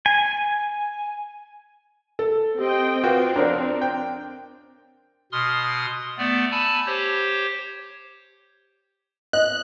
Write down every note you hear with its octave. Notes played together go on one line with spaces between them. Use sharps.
G#5
A4
C4 G4 D#5 G5
C4 F4 F#4 A#4 B4 G5 D6
F2 D4 A#4 C#5 D5
G5
B2 C6 D#6 F6
A3 B3 D5
G#5 A5 B5 E6
G4 C5 C#5
D#5 F#6